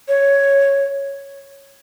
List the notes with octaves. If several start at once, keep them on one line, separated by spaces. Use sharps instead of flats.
C#5